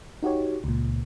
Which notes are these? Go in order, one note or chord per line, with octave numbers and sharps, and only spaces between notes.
D#4 F#4 G4 C#5
C#2 A#2